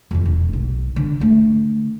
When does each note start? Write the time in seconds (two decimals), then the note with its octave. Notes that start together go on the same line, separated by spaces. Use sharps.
0.11 F2 F3
0.25 E1
0.53 B1
0.96 D3
1.20 D3 A3